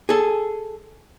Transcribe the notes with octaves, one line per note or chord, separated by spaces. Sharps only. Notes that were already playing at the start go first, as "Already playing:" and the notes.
G#4 A4